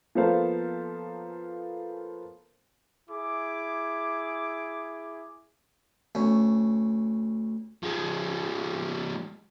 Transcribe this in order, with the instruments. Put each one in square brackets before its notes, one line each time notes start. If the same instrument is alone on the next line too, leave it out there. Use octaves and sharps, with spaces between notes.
[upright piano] F3 A#3 B3 A4 C5 F5
[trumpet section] E4 G#4 D6
[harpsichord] D2 C#4
[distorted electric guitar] F3 G#3